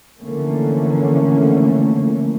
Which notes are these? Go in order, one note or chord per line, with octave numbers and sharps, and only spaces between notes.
D3 E3 F3 A3 A#3 C#4